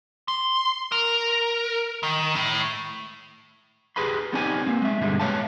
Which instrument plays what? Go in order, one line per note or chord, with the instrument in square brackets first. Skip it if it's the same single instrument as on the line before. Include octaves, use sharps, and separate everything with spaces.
[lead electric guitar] C6
A#4
D#3
A2
[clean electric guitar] G4 G#4 B4 B5 C6
B3 C4 D#4 G4 D5 G#5
A#3 C4
G#3 E5
G2 B2 D3 G3 G#3
B4 C#5 E5 F5 A5